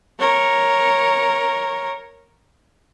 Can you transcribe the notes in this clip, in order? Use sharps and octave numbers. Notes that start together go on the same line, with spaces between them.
A#4 C#5